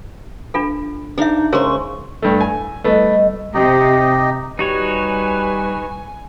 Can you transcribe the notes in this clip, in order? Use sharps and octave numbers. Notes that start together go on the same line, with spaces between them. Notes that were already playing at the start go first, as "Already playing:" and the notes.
D4 F4 A4
D4 D#4 G#4 E5 F5
C#3 G#3 G#4 A#4 C5 C#5 C#6
G2 A3
G#5
G3 A3 B3 D#5
C3 D#4 G4 D#5
G3 D#4 F#4 B4 C#5 G#5